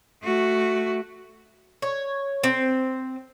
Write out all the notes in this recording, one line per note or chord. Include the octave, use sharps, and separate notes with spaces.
A3 F#4
C#5
C4